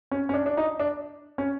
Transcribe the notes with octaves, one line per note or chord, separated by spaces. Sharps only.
C#4
C#4
D4
D4
D#4
D4
C#4